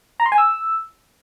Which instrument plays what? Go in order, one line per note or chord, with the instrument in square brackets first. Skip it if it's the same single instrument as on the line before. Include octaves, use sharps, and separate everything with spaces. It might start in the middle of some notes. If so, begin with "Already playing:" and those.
[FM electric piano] A#5
C6
G#5
E6